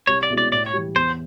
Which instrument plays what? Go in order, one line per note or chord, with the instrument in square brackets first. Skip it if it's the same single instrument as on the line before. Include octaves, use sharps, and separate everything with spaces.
[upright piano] C2 [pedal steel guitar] C#5
[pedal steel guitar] D5
[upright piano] B2 G#3 C#4 E4
[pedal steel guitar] D5
[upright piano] A2 [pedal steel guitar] D5
[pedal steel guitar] C#5
[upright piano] E3 G3
[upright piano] E2 [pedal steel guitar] C5